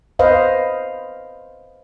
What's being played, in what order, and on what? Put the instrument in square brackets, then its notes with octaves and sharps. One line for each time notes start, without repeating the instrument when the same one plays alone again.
[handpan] B4 C5 D#5 F5